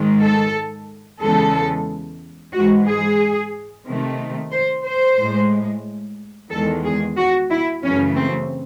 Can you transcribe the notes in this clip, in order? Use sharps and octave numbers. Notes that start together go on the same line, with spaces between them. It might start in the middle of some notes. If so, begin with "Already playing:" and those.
Already playing: G#2 D#3 G#3
A4
E2 C#3 G#3 A4
G#2 E3 G#3 F#4
G#4
C3 D#3 A3
C5
C5
A2 G#3
E2 D#3 G#3 A4
G#4
F#4
E4
F#2 C#3 E3 A3 C#4
C4